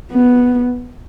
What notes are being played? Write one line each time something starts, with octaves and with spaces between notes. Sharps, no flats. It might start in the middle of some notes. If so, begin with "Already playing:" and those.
B3